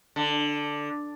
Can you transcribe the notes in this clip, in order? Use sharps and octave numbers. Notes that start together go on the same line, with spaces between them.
D3